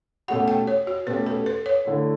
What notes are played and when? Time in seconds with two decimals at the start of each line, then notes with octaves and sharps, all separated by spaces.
0.28 B2 A3 C#4 G4 F#5
0.48 G5
0.67 C#5
0.87 F#4
1.07 B2 A3 C#4 G4 B4
1.26 A4
1.46 B4
1.66 C#5
1.85 D3 A3 E4